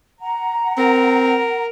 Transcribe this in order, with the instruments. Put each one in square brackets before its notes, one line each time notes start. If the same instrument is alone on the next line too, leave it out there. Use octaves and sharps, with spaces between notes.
[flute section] F#5 A#5
[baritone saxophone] C4 [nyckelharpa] A#4